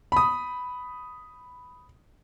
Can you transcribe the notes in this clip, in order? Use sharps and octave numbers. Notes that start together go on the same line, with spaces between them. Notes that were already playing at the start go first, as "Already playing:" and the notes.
B5 D#6